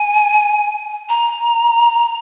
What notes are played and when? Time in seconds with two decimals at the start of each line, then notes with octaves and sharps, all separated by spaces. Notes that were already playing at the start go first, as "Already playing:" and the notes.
Already playing: G#5
1.09 A#5